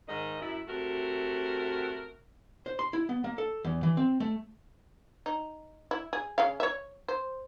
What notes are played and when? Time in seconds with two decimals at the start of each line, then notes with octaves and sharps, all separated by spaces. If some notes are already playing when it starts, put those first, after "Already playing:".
0.08 G#2 D#3 D#4 D#5
0.41 F#2 E4
0.68 C3 A3 F#4 A#4
2.66 C5
2.79 C6
2.93 E4
3.09 B3
3.24 A#3
3.38 A4
3.64 E2
3.83 E3
3.97 C4
4.20 A3
5.26 D#4
5.91 E4
6.13 G#4
6.38 C#3 C#4 F5
6.60 C#5 E5
7.08 C5